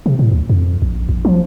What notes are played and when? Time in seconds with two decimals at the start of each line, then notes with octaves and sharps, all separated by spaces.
0.06 C3
0.19 A2
0.32 D2
0.49 F2
0.82 A#1
1.09 A#1
1.25 F3